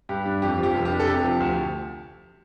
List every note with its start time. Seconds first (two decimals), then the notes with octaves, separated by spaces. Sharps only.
0.09 G2 G4
0.26 D4
0.42 F2 G4
0.58 F3
0.63 G4
0.74 F1
0.85 G4
0.91 D4
1.00 A4
1.07 C3 G4
1.24 F3
1.40 D2